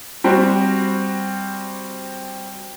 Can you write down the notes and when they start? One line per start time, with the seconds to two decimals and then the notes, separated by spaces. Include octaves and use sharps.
0.24 G3 C4 F#4